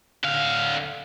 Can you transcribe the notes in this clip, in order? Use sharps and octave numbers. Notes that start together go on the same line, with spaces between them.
D3 F5